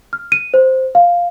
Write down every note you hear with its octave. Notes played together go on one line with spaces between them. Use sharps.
F6
D#7
C5
F5